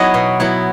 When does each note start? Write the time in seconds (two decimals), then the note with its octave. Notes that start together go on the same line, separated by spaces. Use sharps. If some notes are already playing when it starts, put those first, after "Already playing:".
Already playing: F#3 B3 E4 C#5 D#5
0.14 B2
0.40 F#3 B3 E4